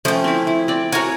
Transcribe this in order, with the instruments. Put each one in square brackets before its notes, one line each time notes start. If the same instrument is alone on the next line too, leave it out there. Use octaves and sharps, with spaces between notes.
[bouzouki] F3 G5 [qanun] A3 C#4
[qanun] C4 E4
E4
C4 D5
[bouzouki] F#4 A#4 [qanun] C#5 G#5